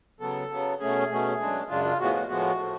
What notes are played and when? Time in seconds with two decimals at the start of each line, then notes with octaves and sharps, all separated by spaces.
0.20 C#3 F#3 B3 A4
0.51 C#3 F#3 B3
0.80 B2 A3 C#4 G#4
1.10 B2 A3 C#4
1.40 F#2 C#3 G#3 D4
1.69 F#2 C#3 G#3 D4 F4
1.85 F4
2.00 A2 F3 G#3 B3 F#4
2.15 F#4
2.28 A2 F3 G#3 B3 F#4
2.58 A2 F3 A3